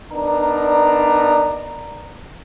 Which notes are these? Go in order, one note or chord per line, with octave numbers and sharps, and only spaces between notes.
B3 D4 D#4 A#4 D5 A#5